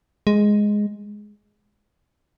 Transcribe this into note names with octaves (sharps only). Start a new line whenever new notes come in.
G#3